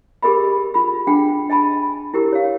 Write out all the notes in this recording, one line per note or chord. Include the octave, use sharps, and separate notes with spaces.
G4 G#4 A#4 D#5 B5
F4 B5
D4 G#4 F#5 G5 B5
D#5 G#5 A5 B5
E4 G4 A#4
C#5 F5